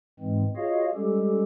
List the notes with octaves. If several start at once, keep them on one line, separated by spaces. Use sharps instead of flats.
G#2 E3 G#3 C4
F4 F#4 G#4 C#5 D#5 F5
G3 G#3 C#4 G4 A4